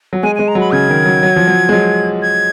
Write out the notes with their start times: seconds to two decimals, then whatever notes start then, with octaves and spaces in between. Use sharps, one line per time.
0.13 F#3
0.23 G#3 G#5
0.35 G#3 G#5
0.48 A#5
0.55 F#3
0.60 B5
0.72 C#3 G#6
0.88 D#3
1.05 F#3
1.23 F#3
1.36 F3
1.47 F#3
1.69 G#3
1.72 F#3
2.22 G#6